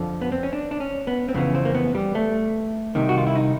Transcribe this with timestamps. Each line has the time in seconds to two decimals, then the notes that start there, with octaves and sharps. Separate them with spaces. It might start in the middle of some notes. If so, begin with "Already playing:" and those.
Already playing: F2 D3 F3
0.21 B3
0.32 C4
0.43 C#4
0.53 D4
0.71 D4
0.80 C#4
1.07 B3
1.28 C4
1.34 F2 C#3 E3 B3
1.55 C4
1.65 A#3
1.75 B3
1.95 G3
2.15 A3
2.95 C2 C3 D#3
3.09 F#4
3.18 F4
3.27 E4
3.35 D#4